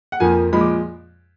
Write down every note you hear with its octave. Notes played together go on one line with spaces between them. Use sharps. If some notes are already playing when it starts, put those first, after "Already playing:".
F#5
F2 F3 A#3 G#5
A#2 F3 G#3 B5
D6